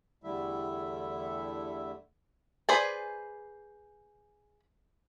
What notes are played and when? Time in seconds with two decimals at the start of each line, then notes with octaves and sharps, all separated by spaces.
0.24 E2 D3 G3 A3 E4 E5
2.69 G#4 B4 C5 D5 G#5